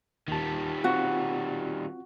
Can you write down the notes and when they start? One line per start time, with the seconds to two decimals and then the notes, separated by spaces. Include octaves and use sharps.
0.28 D#2 D#3 G3 A5
0.84 C4 F4 F#4